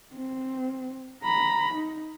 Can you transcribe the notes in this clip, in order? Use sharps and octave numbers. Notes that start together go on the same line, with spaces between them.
C4
A#5 B5
D#4